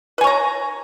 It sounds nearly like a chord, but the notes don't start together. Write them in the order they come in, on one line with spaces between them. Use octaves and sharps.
B4 G#5 C#5 A#5